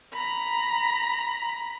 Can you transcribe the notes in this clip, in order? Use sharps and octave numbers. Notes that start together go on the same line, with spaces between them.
A#5 B5